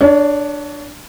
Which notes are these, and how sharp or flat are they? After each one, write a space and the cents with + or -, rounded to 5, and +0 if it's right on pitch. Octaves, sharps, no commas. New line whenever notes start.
D4 +5 C#5 +30